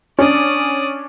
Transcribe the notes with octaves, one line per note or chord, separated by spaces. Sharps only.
C#4 D4 D5 D#6